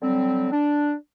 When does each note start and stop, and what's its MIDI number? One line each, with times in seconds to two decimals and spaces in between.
0.02 0.51 50
0.02 0.51 54
0.02 0.51 55
0.02 0.51 60
0.52 0.94 62